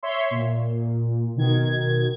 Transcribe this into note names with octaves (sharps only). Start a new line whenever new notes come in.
C#5 E5 C6
A#2
B2 D#3 G#6